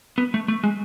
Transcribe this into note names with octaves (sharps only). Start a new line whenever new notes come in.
B3
A3
A3
G#3